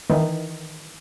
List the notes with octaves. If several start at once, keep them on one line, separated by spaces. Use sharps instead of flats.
D#3 E3